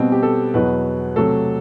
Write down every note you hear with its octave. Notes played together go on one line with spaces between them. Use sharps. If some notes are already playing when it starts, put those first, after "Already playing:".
Already playing: B2 G3 B3 C4
G4
A4
E2 B2 F#3 B3 B4
C3 F#3 A3 A4